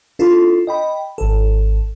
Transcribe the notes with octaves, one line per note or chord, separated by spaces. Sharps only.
D4 E4 F4 A4
D#5 G5 B5
G#1 A4